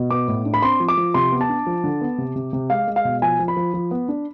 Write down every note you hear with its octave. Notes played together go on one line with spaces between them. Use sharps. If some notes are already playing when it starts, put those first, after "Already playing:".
Already playing: B2
B3 D6
A2
D4
B5
C4 C6
F3
D6
F3
C3 C6
B3
A5
D4
F3
D3
B3
C3
C3
C3
G#3 F5
G#3
F5
B2
F3 G#5
F3
B5
F3
F3
B3
D4